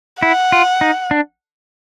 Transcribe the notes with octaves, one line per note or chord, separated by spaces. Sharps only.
E4 F#5
F4
D#4
D4